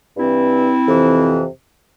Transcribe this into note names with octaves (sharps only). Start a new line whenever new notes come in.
G2 E3 C4 E4
F2 C3 E3